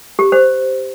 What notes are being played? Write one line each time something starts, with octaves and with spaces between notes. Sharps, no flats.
G4
C5